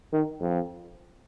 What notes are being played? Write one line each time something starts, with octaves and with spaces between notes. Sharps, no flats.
D#3
F2